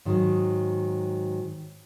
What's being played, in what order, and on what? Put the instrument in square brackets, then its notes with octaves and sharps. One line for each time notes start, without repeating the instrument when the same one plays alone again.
[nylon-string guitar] G#2 D#3 F#3